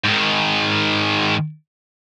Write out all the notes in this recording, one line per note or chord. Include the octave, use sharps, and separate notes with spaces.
G#2 D#3